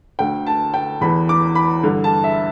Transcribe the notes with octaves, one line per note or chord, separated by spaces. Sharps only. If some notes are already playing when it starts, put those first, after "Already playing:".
D2 D3 G5
A5
G5
E2 E3 B5
D6
B5
G2 D3
A5
E5